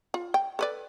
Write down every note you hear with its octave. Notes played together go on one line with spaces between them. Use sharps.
F4
G5
A4 B4 D5